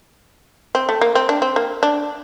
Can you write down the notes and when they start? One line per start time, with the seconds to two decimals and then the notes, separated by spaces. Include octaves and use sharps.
0.75 C4
0.89 A3
1.01 A#3
1.15 C4
1.29 D4
1.42 C4
1.56 A#3
1.83 D4